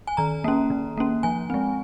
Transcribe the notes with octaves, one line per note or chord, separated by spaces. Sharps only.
G#5
D#3 A#5
A#3 C#4
D#3
A#3 C#4
F3 G#5
G#3 C4